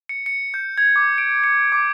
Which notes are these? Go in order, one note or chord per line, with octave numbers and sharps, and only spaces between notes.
C#7
C#7
G6
G#6
D6
D7
C#7
D6